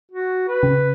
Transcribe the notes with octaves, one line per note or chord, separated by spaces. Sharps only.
F#4
B4
C#3